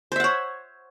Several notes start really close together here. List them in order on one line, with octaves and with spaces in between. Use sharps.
C5 E5 F#5 C#5